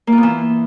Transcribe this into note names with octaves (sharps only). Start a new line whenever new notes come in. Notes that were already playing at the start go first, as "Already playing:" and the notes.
A#3
F4
B3
E3